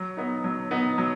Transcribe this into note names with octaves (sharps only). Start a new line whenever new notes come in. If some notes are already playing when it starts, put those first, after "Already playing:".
Already playing: F#3
B3 D#4
F#3
B3 D#4
F#3